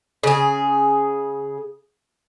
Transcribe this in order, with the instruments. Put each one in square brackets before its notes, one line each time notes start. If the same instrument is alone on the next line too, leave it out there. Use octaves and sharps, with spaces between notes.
[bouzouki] C#3 G#4